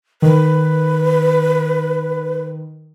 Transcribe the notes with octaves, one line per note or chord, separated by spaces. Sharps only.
D#3 B4